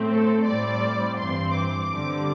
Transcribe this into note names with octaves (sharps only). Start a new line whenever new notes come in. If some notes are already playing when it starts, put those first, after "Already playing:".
Already playing: A2 A3 C4
A4
A2 G3 C4 D5
G2 E3 C4 C6
D6
G2 D3 G3 C4